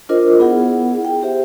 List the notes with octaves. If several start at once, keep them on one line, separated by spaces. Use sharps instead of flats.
D4 F4 A#4 C5 D#5
B3 E4 G#4 F#5
G5
G4 C5 E5